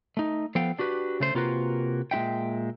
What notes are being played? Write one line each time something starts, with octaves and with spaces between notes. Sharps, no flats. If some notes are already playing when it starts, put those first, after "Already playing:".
A3 D#4
F3 B3 A4 F5 G5
D4 F#4 G4 B4
C#3 A3 C5
C3 A#3 F4 F#4 A#4 B4
A#2 G#3 E4 E5 G5